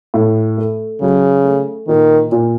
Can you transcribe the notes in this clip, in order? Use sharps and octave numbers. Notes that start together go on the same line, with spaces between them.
A2
A3
C#3 F#3
A3
A#2 D#3
A#2